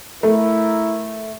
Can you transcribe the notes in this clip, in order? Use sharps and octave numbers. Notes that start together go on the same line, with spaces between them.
A3 E4 A#4